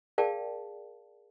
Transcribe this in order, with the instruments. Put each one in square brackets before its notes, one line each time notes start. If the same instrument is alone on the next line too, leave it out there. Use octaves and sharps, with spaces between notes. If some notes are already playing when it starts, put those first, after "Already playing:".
[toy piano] G#4 A#4 D5 F5 G5 A5